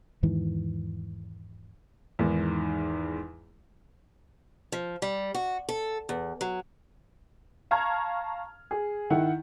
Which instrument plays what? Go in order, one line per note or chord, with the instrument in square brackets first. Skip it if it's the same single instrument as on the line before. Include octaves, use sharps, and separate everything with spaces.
[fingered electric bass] E2 G#2 D#3 E3
[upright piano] E2 G#2 D#3
[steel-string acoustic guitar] F3
G3
F#4
A4
E2
F#3
[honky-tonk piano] F5 A5 A#5 C#6 F6 G#6
G#4
D#3 E4 F#5